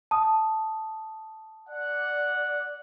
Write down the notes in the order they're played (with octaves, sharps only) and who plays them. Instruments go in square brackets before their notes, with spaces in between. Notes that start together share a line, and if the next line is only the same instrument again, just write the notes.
[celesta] A5 D#6
[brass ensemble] D5 F#5